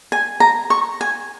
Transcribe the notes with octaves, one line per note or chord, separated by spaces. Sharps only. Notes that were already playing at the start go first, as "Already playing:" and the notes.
G#5
A#5
C#6
G#5